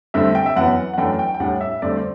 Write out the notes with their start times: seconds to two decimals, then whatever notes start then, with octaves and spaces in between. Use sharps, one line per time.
0.14 G2 D3 A3 C4 E5
0.35 G5
0.46 E5
0.56 F#2 E3 B3 F#5
0.93 F#5
0.98 F#2 E3 A3 D4 G5
1.19 G5
1.34 G5
1.40 A2 G3 D4 F#5
1.61 E5
1.82 G2 D3 A3 C4 D5
1.97 C5